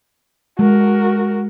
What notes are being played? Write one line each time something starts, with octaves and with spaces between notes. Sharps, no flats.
G#3 F#4 A#4